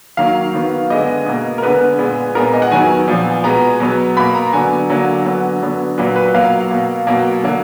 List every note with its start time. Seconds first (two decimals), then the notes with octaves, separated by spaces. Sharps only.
0.17 D#3 F#3 A#3 F5
0.54 D#3 F#3 B3
0.90 D3 G#3 B3 D#5
1.26 B2 A#3
1.58 A#4
1.62 D3 G#3 B3 B4
1.99 A#2 G#3 B3
2.35 A#2 G#3 B3 A#4
2.54 D#5
2.62 F#5
2.71 D#3 F#3 B3 G#5
3.08 A#2 F3 B3
3.44 B2 G#3 B3 A#5
3.80 B2 F#3 B3
4.17 B2 A#3 B5
4.35 A#5
4.53 D3 F#3 B3 G#5
4.90 D3 F#3 A#3
5.25 D3 F#3 B3
5.62 D3 F#3 B3
5.98 A#2 F#3 A#3 B4
6.16 B4
6.34 B2 F#3 A#3 F5
6.71 B2 A#3
7.07 B2 F#3 A#3
7.43 D3 F#3 A#3